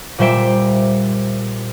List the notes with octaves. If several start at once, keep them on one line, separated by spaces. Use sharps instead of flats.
A#2 G3 C5 E5 D7